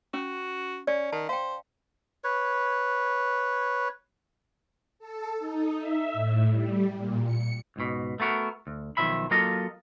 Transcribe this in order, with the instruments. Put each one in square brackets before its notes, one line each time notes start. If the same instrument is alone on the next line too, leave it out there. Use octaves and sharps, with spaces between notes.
[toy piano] C#4 [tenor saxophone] F#4
[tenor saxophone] C#4 [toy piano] D5
[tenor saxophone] D#3 [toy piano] A5
[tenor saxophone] C5 [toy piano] F5 G5
[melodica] B4 C#5
[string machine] A4
D#4
E5
A2
G3
A#2
C#7
[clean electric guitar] C#2 G#2 B2
A3 B3 F#4 A#4
D2
B1 D#3 F3 E5 B5
F#3 A#3 F4 A4 D#5 A#5